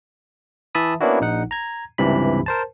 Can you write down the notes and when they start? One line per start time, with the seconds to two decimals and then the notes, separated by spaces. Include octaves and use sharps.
0.75 E3 E5 A5 B5 D#6
1.01 A#3 B3 C#4 D4 E4 F#4
1.21 A#1 D#4 F#5
1.51 A#5 G#6
1.98 C#2 G2 C3 E3 B5
2.46 A#4 C5 A5